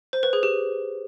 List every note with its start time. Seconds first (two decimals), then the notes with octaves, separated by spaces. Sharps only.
0.13 C5
0.23 B4
0.33 G#4
0.43 G4